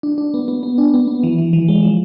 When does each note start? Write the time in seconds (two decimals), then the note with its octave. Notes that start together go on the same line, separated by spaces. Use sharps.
0.03 D4
0.18 D4
0.34 B3
0.48 B3
0.63 B3
0.78 D4
0.94 B3
1.08 B3
1.23 E3
1.38 E3
1.53 E3
1.68 G#3
1.83 F3